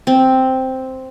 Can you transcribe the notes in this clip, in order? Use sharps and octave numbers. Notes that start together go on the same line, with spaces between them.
C4